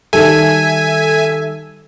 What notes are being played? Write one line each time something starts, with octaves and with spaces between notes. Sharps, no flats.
D#3 G3 A4 E5 G#5